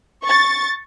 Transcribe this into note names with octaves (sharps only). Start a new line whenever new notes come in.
C#6 A6